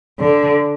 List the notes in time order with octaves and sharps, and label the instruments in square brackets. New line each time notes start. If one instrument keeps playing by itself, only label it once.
[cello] D3